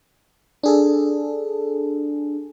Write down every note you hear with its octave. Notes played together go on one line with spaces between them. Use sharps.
D4 G#4 A4